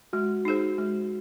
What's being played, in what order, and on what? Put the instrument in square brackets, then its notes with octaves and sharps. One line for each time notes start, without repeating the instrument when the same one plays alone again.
[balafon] G#3 [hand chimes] F#4
[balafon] D#4 G#4 C5
G#3